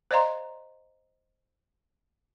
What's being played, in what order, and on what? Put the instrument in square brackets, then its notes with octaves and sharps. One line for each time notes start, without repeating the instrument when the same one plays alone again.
[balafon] C5 D5 D#5 F5 A#5 C6